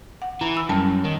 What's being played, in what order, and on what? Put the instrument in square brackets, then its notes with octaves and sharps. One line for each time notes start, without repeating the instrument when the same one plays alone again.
[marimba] F#5
[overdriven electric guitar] E3 [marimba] A#5
[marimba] B5 E6
[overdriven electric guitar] F#2 [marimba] G3 A5
[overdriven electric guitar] D#3